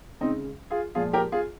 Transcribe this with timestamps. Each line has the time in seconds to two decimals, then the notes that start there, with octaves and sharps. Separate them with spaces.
0.21 C#3 G#3 C4 D#4
0.70 F4 G#4
0.95 A#2 F3 G#3 F4 G#4
1.13 G4 A#4
1.32 F4 G#4